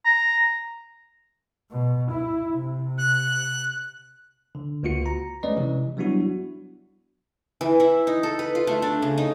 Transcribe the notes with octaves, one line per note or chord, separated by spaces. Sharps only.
A#5
B2
E4
C3
F#6
D3
C#2 A#3 F4 F#4 C#7
A#5
G#3 A3 C#4 B4 D5 D#5
C3 E3
F#3 G3 B3 D4 E4 F#4
E3
E4
D#4
A4
B4
F4
A3
D4
C#3
D#4